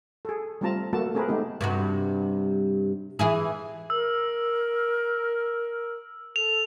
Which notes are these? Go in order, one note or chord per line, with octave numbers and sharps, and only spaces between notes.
G#4 A4
G3 A3 C4 F4 A5 A#5
A3 A#3 F#4 A4 A5
A3 C4 G#4 A#4 B4
G#3 A3 B3 D#4 G4
G2 C3 F#4
E3 E4 G#4
A#4 E6
A4 F7